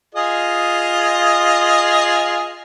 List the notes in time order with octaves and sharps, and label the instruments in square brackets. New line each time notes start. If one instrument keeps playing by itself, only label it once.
[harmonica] F4 G#4 D#5